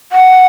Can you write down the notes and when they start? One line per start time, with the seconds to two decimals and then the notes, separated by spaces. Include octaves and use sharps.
0.12 F#5